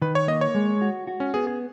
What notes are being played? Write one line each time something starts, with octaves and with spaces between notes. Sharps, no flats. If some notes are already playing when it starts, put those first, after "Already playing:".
D#3 B4
C#5
A#3 D#5
C#5
G#3
F#4
F#4
C#4
B3 G#4
G#4